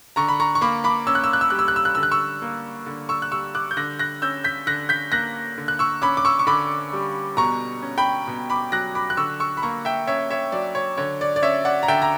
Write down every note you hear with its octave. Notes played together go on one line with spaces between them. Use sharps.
D3 A#5 C#6
B5
A#5 C#6
C#6
A#3 B5 D6
B5 D6
C#4 E6
F#6
E6
F#6
E6
G3 F#6
E6
F#6
E6
F#6
D3 E6
F#6
C#6 E6
A#3
D3
C#6 E6
F#6
G3 C#6 E6
D6 F#6
G6
D3 F#6 A#6
F#6 A#6
C#4 E6 G6
G6 B6
D3 F#6 A#6
G6 B6
A#3 F#6 A#6
D3
F#6
C#6 E6
C#4 B5 D6
D6
C#6 E6
C#6
D3 B5 D6
G3
B2 A#5 C#6
C#4
G5 B5
B2
B5 D6
F#3 F#6 A#6
B5 D6
F#6
D3 C#6 E6
C#6 E6
B5
A#3 A#5 C#6
E5 G5
C#4 C#5 E5
C#5 E5
F#3 D5
C#5
D3 C#5
D5
D5
C#4 C#5 E5
D5 F#5
A#5
D3 E5 G5
A#5